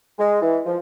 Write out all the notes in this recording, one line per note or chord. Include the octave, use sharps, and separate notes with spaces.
G#3
E3
F3